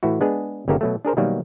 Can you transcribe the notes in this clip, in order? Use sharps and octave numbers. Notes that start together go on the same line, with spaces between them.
A2 E3 E4 F#4
G#3 B3 D4 G#4
G1 C#3 A#3 D#4 G4 A4
B2 F#3 A3
D4 G#4 A#4 C5
B2 D#3 F#3 G3 A#3